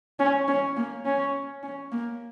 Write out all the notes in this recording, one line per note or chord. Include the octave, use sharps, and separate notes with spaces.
C#4
C#4
A#3
C#4
C#4
A#3